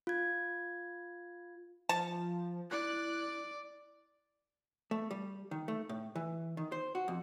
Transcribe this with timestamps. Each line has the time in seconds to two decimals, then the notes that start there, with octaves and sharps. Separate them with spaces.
0.07 F4 G#6
1.89 F3 A5
2.71 E4 D5 F#6
4.91 A3
5.11 G3
5.51 D#3
5.68 A3
5.89 A2
6.15 E3
6.57 D#3
6.72 C5
6.95 F#4
7.08 F2